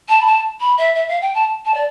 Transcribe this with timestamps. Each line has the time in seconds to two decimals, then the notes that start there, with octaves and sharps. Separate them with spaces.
0.09 A5
0.21 B5
0.26 A5
0.60 B5
0.78 E5
0.95 E5
1.08 F5
1.22 G5
1.35 A5
1.65 A5
1.74 D5